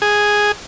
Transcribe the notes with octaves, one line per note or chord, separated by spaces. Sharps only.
G#4